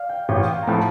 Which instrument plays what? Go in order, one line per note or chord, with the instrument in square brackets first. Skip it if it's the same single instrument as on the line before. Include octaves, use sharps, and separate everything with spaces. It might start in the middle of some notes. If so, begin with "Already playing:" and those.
Already playing: [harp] D5 F5
G5
[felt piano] A1 [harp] G5
[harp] F5
G5
A#5
[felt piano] A2 F3 [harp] A5